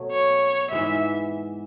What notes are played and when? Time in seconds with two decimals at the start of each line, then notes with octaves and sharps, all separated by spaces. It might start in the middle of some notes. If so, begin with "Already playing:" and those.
Already playing: B2 F#3 A3
0.12 C#5
0.71 G#2 E3 G#3 B3 E5